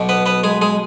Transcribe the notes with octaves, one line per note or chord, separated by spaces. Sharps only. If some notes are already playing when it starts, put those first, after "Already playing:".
Already playing: B1 B2
B3 B4
B3 B4
G#3 G#4
G#3 G#4